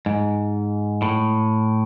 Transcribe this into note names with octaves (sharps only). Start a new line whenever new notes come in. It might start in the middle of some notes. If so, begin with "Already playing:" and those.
G#2
A2